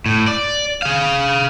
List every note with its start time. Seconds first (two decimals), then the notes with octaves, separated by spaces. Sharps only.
0.06 A2
0.28 D5
0.82 G#4 F5